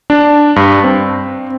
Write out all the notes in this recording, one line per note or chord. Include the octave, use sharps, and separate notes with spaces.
D4
G2
C4